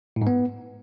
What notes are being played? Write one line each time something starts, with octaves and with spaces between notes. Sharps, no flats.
A2
G#2
B3